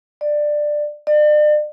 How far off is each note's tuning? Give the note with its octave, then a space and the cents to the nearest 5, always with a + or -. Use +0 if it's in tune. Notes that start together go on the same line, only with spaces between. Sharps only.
D5 +15
D5 +40